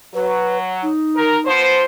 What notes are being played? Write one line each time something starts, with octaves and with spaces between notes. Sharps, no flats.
F#3 B4
D#4
A#4
F3 B3 C5